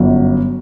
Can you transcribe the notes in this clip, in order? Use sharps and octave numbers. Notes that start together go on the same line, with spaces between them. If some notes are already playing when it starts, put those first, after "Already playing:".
Already playing: G1 F#2 F#3